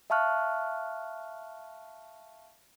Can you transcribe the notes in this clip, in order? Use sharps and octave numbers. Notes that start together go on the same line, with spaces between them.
E5 F5 A5 C#6 F6 F#6